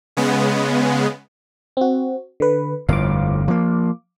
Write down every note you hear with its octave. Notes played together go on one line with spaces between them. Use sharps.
C#3 G#3 B3
C4 F#4
D3 B4
G1 F2 A2 F5 D6
F3 A#3